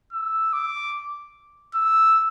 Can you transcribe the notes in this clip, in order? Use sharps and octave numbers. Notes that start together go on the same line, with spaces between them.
E6
D6
E6